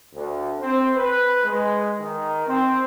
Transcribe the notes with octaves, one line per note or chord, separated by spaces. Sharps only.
D2
C4
B4
G#3
D#3
C4